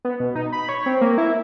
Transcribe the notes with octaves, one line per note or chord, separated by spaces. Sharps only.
B3
B2
D#4
B5
C#5
C4
A#3
E4